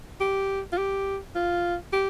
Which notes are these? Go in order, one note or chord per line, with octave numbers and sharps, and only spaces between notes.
G4
F4
G4
F4
G4